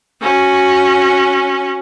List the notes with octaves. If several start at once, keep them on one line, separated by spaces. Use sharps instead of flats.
C#4 F#4